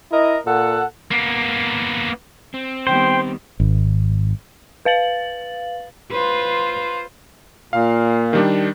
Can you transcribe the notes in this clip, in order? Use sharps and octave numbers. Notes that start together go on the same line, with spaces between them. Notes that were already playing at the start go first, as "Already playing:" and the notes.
E4 A#4 D#5
A#2 A4 F#5
A#3 B3
C4
D#3 G3 B3 C5 G5
G#1
B4 F5 A6 F#7
F4 B4 C5
A#2 F5
D#3 G3 D4